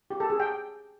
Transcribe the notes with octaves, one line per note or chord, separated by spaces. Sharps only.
G4
A4
G#4
G5